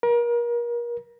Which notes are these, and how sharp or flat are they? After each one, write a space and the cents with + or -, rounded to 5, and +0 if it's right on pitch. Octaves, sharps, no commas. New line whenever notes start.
A#4 +35